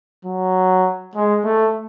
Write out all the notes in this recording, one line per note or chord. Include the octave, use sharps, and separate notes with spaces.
F#3
G#3
A3